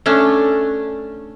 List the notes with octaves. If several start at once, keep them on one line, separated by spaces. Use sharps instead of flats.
A3 C#4 D4